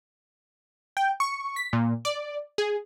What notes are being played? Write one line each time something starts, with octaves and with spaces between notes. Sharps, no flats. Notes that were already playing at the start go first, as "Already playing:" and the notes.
G5
C#6
B6
A#2
D5
G#4